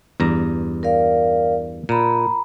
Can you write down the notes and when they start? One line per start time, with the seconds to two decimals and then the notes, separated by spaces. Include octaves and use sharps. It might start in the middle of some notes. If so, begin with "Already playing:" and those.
0.20 E2 G2 A#5
0.83 A#4 D5 F5
1.89 A#2 A#5 B5